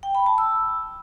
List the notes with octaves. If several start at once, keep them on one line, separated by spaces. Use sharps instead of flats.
G5
B5
A5
E6